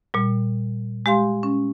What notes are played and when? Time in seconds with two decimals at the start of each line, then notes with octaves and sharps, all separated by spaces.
0.14 A#2 G3
1.06 G#3 G4 F5 C6
1.43 C#4